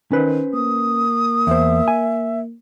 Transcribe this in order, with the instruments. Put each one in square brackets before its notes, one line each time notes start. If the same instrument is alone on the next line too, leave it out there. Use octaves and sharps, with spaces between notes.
[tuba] D#3 [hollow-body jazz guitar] C#4 B4 C5
[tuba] A#3 [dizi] D#6
[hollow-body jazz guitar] E2 C5 [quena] E5
[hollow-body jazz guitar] G#5